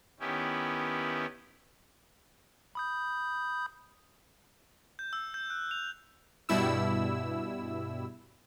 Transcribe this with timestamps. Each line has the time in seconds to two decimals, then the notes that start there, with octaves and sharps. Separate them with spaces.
0.20 D#3 B3 C#4 E4 G4
2.75 B5 D#6 G6
4.99 G6
5.13 E6
5.34 G6
5.50 F#6
5.71 F7
6.49 G2 B2 G3 E4 E6